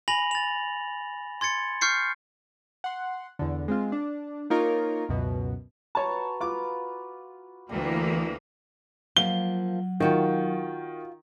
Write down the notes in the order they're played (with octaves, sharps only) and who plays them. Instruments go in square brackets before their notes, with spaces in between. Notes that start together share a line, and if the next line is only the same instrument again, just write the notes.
[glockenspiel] G#5 B5 A#6 F7 F#7
A6 F7
C6 G#6 A6 C#7
C#6 F6 G6 C7 C#7
[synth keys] F#5 C6
E2 D3
G#3 C4 F4
D4
A#3 D#4 F4 A#4 C#5
C#2 F#2 B2
[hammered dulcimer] F#4 B4 A#5 [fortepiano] C#5 A5
[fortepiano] F4 D6 [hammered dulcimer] B4 A#5
[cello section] D2 E3 A#3 [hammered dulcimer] G3
[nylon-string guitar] F3 A#3 [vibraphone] F#3 [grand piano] G7
[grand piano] D#3 [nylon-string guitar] F4 F#4 G5